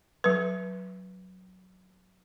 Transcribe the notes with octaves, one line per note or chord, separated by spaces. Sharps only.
F#3 B4